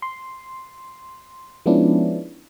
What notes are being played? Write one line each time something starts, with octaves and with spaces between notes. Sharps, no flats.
C6
F3 G#3 B3 C#4 D4 E4